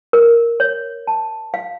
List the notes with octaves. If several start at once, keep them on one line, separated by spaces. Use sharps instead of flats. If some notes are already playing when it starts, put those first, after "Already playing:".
A#4
C#5
A5
F5